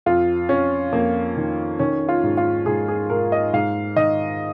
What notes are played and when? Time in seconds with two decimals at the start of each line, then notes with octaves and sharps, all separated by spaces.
0.06 F2 F4
0.49 F2 C#4
0.92 F2 A#3
1.37 D#3
1.79 D#3 C#4
2.09 F4
2.23 G#2
2.37 F4
2.66 G#2 G#4
2.88 G#4
3.10 G#2 A#4
3.32 D#5
3.53 G#2 F5
3.96 D#3 D#5